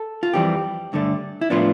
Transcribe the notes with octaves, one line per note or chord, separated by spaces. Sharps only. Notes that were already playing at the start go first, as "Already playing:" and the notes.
Already playing: A4
F4
F2 E3 G3 C4 G4
G2 D3 A3 D4
E4
A2 F3 B3 D4 F4